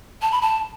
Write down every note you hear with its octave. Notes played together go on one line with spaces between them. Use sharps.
A5
B5
A5